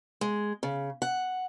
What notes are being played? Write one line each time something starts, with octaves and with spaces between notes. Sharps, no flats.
G#3
C#3
F#5